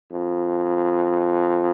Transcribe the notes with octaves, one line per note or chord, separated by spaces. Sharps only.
F2